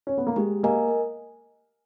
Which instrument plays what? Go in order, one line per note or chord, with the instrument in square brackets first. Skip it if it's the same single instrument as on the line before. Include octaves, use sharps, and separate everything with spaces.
[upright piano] C#4
B3
A#3
[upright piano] G#3 [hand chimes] G4
[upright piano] A#3 [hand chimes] A#4 D#5 G#5